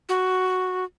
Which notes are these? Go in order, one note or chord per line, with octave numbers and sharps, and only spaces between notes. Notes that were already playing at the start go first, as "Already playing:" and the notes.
F#4